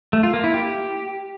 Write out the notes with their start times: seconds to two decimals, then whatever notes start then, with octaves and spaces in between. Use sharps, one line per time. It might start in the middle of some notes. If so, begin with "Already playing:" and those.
0.13 A3
0.23 F4
0.34 A#3
0.44 E4
0.54 G4